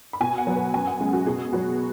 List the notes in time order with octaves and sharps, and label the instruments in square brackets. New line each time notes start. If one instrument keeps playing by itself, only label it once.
[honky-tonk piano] B5
B2 G#5
F#5
F#3 B3
B4
F#2 G#5
F#5
C#3 G#3 G#4
F#4
B2 G#4
F#3 B3 F#4